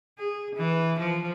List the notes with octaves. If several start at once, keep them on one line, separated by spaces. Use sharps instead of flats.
G#4
E3
F3